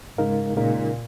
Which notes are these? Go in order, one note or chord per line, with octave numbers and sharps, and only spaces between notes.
G#2 C#3 G#3 D#4 A#4 F5
A#2 C#3 G#3 D#4 A#4 F5